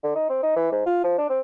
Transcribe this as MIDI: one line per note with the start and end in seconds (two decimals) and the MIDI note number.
0.03 0.12 50
0.15 0.27 63
0.29 0.40 60
0.43 0.56 63
0.56 0.70 52
0.72 0.86 44
0.86 1.01 65
1.04 1.16 53
1.18 1.28 62
1.29 1.40 60